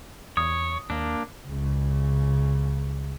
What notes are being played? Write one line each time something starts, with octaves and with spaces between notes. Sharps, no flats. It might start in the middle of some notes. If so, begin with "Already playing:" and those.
E2 C#5 D#6
D#2 A#3 D4
C#2 C#3